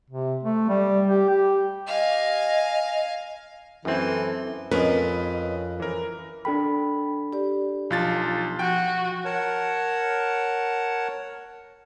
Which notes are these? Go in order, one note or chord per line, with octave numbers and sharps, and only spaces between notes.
C3
A3
G3
G4
G4
D#5 F5 G#5
F#2 E3 C4 A4
F2 C#4 A#4 B4 D#5
E3 A#4
D4 A4 G5 B5
G4 D5
B1 F3 F4 A5 A6
F3 F#4 G5
A#4 C#5 F#5 A5